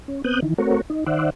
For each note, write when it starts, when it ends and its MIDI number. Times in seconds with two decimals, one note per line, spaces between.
0.08 0.22 61
0.24 0.40 59
0.24 0.40 60
0.24 0.40 87
0.24 0.40 90
0.24 0.40 91
0.42 0.54 51
0.42 0.54 52
0.58 0.81 57
0.58 0.81 60
0.58 0.81 66
0.58 0.81 70
0.58 0.81 73
0.90 1.04 63
1.06 1.30 51
1.06 1.30 72
1.06 1.30 74
1.06 1.30 76
1.06 1.30 78